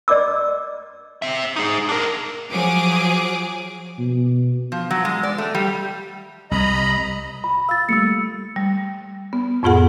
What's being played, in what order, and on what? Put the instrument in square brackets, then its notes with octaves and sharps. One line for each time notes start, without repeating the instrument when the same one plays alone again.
[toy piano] D5 D#5 D6 E6
[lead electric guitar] C4 E5
D#4 G#4
D4 A#4
[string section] F3 F#3 G#4 D6
[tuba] B2
[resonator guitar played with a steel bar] F3
F#3
G#3
D5
A3
G3
[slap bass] C2 [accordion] D#5 A#5 B5
[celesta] B5
[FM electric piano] F5 [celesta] E6 A6
[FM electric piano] G3 A3 A#3 [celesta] E6 C#7
[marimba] G3
B3
F2 A2 B3 F4 G#4 F#5